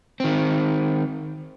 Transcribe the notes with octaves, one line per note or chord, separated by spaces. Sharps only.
D#3 C4